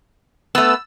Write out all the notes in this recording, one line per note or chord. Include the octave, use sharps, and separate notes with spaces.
A3 B3 E6